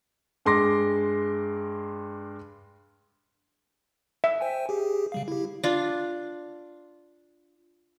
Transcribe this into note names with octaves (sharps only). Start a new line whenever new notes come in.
G2 G#3 C6 D6 A#6
E5
C5 G5 G#5
G4 G#4
C#3 G3 F5
E4 G4
D4 F4